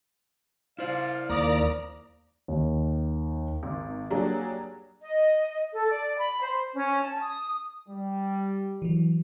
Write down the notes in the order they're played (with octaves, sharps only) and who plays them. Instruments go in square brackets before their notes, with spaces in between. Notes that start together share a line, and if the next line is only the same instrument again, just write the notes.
[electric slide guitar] E4 C5 [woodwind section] D5 F5
[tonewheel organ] D#2 A#3 A#5 [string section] D5 [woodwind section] F5 D6 D#6
[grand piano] D#2
[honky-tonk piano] G#1
F#3 G3 A#3 D4 G#4
[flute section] D#5
A4
D5
B5
C5
C#4
A5
D#6
[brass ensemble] G3
[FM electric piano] E3 F#3